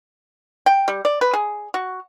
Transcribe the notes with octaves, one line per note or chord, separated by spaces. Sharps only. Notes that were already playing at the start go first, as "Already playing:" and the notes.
G5
G3
D5
B4
G#4
F#4